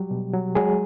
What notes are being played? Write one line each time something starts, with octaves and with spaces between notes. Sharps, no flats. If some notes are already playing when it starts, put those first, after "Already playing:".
Already playing: F#3 G3 G4
B2
F#3
F#3 G#3 G#4